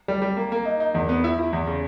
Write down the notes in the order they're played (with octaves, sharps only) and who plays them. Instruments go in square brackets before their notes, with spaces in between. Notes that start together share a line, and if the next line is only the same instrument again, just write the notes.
[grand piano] G3
G3
A#3
A#3
D#4
D#4
E2
B3
E4
E4
E2
C#3